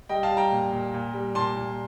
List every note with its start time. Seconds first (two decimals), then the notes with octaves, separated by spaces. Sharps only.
0.09 G3 D#5 G5
0.23 F5 A5
0.31 G3
0.37 G5 A#5
0.52 A#2
0.72 A#2
0.94 A#2
1.14 G3
1.35 A#2 A5 C6
1.56 A#2